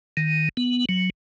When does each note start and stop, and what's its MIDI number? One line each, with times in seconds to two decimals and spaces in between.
0.17 0.49 51
0.57 0.85 59
0.89 1.10 54